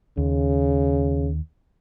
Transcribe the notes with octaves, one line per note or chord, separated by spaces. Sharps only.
D#2 C#3